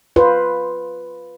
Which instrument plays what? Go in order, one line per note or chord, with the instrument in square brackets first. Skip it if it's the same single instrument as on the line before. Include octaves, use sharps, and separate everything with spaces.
[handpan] F4 B4 C5